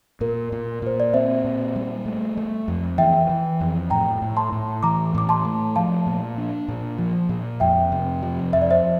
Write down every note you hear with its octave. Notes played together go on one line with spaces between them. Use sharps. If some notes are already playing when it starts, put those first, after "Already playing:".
A#2 A#4
A#2
A#2 C5
D5
C4 C5 E5
A#2
G3
A3
A3
F2
E3 E5 G5
E3
F2
A2 G5 A#5
A2
A5 C6
A2
E3 A#5 D6
A2 D6
A5 C6
A3
F3 F5 A5
A#2
D4
A#2
F3
A#2
F2 E5 G5
C3
F3
F2 E5
D5
C5 E5